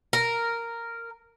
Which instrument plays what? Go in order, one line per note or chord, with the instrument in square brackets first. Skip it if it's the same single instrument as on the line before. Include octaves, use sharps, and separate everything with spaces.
[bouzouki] A#4